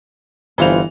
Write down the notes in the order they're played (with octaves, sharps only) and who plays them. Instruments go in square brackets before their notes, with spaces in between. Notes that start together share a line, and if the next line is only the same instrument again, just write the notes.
[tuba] G1 [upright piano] E3 F4 F7 [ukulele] C5 B5